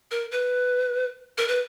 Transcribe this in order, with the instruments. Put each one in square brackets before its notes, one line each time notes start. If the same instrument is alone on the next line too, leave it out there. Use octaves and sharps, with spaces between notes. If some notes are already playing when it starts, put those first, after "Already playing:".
[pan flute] A#4
B4
A#4
B4